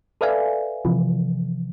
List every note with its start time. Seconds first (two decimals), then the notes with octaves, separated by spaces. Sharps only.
0.21 A4 B4 D5 E5 F5 G#5
0.85 C3 E3 F3